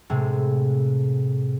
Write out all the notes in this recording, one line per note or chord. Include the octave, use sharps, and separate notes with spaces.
A2 C3 G#3